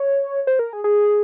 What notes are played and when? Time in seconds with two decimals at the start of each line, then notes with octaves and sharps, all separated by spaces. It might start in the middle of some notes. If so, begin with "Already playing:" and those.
Already playing: C#5
0.47 C5
0.59 A#4
0.73 G#4
0.84 G#4